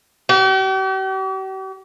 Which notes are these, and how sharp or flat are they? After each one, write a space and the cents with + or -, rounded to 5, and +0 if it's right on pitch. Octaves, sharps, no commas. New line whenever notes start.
G4 -45